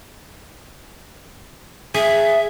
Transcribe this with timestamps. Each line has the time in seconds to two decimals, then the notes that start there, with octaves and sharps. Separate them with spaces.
1.94 G#4 E5